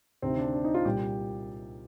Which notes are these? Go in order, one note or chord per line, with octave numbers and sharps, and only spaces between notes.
D2 C3 D#3 C4
D4
D4
D#4
F4
C2 A#2 G3 G4